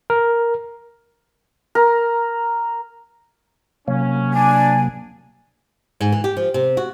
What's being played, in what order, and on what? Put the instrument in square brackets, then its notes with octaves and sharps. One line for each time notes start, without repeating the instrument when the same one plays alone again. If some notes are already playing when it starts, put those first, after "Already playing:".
[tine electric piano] A#4
[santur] A#4
[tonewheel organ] C3 F#3 A#3 [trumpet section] C#4
[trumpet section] D4 [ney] G#5
[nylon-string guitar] G#2
E3
G4
F3
C3
F#4